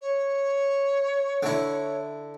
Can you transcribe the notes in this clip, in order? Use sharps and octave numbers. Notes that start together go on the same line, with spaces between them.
C#5
D3 E4